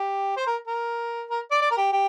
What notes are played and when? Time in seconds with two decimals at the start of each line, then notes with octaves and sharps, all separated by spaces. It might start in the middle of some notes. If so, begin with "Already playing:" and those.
Already playing: G4
0.37 C5
0.47 A#4
0.67 A#4
1.30 A#4
1.51 D5
1.61 D5
1.71 A#4
1.77 G4
1.93 G4